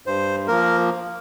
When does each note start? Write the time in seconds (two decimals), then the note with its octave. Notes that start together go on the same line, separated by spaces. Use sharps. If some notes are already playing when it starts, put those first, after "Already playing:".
0.06 G2 C5
0.48 F3 A#3 A#4